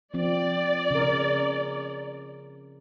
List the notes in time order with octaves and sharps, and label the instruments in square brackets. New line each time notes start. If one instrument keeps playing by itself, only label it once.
[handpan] F3 C4 [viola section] D5
[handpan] C#3 A#4